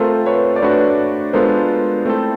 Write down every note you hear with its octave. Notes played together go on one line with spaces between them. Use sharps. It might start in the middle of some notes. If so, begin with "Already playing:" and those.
Already playing: A3 C4 F4 A4 A#4 C5
B4 C#5
D5
A3 D4 F#4 B4 C#5
G#3 B3 D4 F4 A4 A#4 C5
A3 C4 E4 A4